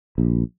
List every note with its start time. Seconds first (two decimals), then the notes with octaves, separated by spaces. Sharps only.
0.18 A#1